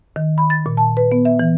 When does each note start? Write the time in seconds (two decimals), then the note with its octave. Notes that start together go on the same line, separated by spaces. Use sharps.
0.16 D#3
0.38 B5
0.50 A6
0.66 A#2
0.77 A5
0.97 B4
1.12 B3
1.25 E5
1.39 E3